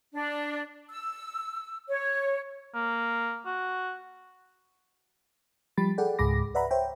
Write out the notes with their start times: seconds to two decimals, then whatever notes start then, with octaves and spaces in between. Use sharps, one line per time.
0.14 D4
0.90 E6
1.89 C#5
2.75 A#3
3.47 F#4
5.77 F3 G3 G4 B5 A6
5.98 G#4 A4 D5 F#5 G5
6.19 C#2 G#2 G#4 B5 D6 A#6
6.55 B4 D5 E5 F#5 A#5 B5
6.71 C5 C#5 E5 G5